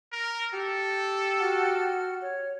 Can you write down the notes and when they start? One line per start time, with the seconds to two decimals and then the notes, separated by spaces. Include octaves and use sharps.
0.12 A#4
0.53 G4 A4
1.39 F#4 F#5 F6
2.22 C#5